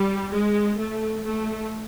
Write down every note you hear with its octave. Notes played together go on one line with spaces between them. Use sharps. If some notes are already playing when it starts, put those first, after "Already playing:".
Already playing: G3
G#3
A3
A3